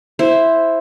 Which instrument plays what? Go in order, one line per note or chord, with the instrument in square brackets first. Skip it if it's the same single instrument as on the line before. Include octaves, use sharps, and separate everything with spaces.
[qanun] E4 C5